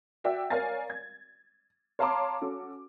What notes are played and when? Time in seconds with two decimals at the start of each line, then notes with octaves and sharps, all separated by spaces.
0.24 F#4 D5 E5 G5
0.50 A#4 C#5 D5 F5 G#5 A6
0.90 G#6
1.99 C#5 F5 A5 A#5 C6 D6
2.42 C#4 F#4 A4